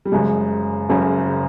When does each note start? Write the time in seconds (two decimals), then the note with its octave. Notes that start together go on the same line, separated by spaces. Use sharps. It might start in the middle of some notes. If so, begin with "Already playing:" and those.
0.05 G3
0.12 F#1 F#2 C#3 G#3
0.89 F#1 F#2 C#3